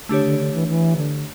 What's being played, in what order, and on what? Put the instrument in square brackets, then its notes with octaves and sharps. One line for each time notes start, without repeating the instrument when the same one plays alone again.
[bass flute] D3 [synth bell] A3 D4 G4 C#5
[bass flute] D3
D3
E3
E3
D3